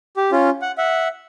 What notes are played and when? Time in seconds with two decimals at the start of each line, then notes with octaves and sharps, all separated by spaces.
0.17 G4
0.32 C#4 F4
0.62 F#5
0.78 E5 F#5